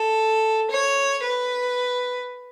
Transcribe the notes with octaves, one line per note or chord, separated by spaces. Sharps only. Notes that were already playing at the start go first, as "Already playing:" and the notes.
Already playing: A4
C#5
B4